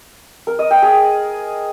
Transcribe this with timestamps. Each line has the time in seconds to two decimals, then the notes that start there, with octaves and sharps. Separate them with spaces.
0.47 A#4
0.59 D#5
0.71 G5
0.82 G#4